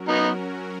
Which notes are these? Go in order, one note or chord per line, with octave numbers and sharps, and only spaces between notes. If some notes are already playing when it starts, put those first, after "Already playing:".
Already playing: F#3 C#4 F#4 A#4
B3 D#4